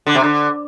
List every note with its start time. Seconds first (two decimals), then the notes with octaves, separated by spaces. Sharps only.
0.07 D3
0.15 C3
0.24 D3